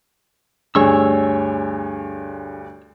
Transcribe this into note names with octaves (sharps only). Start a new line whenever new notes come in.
D2 G2 D4 G#4 C#5 G#5 C#6 E6